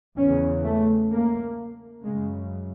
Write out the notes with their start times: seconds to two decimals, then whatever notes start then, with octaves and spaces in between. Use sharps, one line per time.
0.17 E2 C#3 C#4
0.64 A3
1.11 A#3
2.04 F#2 C#3 G#3